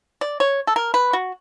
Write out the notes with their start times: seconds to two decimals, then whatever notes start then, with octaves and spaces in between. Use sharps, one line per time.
0.21 D5
0.40 C#5
0.67 A4
0.76 A#4
0.94 B4
1.13 F#4